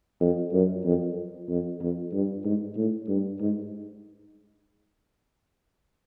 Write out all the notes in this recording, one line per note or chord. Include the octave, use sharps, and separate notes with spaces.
F2
F#2
F2
F2
F2
G2
G#2
A2
G2
G#2